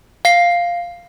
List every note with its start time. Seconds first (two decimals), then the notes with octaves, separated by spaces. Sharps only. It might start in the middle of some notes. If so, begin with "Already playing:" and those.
0.25 F5 C7